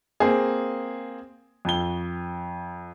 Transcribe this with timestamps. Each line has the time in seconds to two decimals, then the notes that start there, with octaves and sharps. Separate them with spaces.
0.20 A#3 C4 G#4
1.65 F2 G7